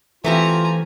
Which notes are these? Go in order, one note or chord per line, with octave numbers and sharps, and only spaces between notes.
E3 A3 C4 F4 G4 G#5 A#5